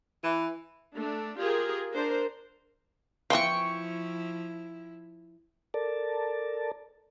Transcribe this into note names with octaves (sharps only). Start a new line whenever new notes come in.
E3
A3 D4
F4 G4 G#4 A#4
D4 A#4 C5
E3 F3 C4 E4 F5 G5 C#6
A4 A#4 D5 A5